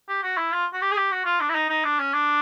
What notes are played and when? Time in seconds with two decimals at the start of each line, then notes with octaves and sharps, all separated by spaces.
0.09 G4
0.23 F#4
0.37 E4
0.52 F4
0.73 F#4
0.81 G4
0.91 G#4
0.97 G4
1.11 F#4
1.25 F4
1.40 D4
1.49 E4
1.55 D#4
1.70 D#4
1.84 D4
1.99 C#4
2.14 D4